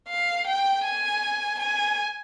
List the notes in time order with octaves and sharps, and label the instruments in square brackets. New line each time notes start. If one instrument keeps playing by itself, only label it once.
[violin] F5
G5
G#5
G#5